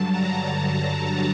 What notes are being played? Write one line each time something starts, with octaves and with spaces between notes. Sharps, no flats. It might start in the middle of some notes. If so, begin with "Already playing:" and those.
Already playing: G2 D3 F#3 A5
A#5